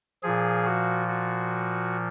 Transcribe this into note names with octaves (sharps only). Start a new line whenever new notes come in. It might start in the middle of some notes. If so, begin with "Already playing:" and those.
A#2 F3 G#4
F#4
F#4